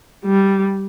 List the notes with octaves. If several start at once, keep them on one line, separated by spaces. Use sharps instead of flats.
G3